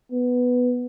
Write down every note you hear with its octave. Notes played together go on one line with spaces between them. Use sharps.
B3